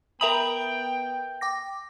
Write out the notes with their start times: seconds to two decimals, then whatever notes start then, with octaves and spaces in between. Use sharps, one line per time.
0.21 B3 A#4 E5 G5 A#5 B5 D#6
1.41 G5 D6 A#6